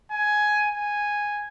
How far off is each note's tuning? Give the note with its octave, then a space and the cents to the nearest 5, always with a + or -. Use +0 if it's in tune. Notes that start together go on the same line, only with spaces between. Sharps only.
G#5 +10
G#5 -5